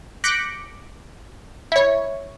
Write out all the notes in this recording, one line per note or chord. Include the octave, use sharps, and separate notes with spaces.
D6 F#6 G6 A#6 B6 C#7
E4 C#5